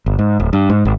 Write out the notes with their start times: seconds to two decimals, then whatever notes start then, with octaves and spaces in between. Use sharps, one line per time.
0.06 G1
0.19 G#2
0.40 D1
0.53 G2
0.70 G#2
0.85 G#1